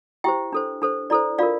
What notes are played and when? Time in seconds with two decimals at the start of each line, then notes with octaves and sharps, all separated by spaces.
0.24 E4 G4 C5 E5 G5
0.52 D4 A4 C5
0.82 D4 A4 C5
1.10 E4 A4 C5 D5
1.39 D4 F4 A#4 D5 F5